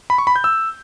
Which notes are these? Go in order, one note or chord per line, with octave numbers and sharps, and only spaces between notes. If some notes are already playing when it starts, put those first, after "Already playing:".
B5
C#6
B5
G6
E6